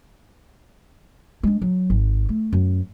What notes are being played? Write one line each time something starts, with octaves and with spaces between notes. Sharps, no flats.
G#3 D4
F#3
G#1
A3
F#2